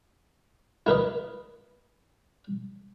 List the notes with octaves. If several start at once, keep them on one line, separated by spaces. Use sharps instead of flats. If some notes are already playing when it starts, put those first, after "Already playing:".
E4 A#4 B4 D#5